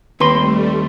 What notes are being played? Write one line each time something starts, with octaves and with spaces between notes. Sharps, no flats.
D#2 G3 A3 C4 B4 C6